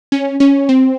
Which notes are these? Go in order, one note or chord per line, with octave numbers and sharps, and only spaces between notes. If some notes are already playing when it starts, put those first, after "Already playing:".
C#4
C#4
C4